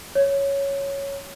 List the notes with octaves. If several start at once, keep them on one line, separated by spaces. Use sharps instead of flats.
C#5